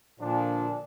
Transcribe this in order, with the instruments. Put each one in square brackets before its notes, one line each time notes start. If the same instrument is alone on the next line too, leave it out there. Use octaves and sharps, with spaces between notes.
[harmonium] A#2 [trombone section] D3 F3 D4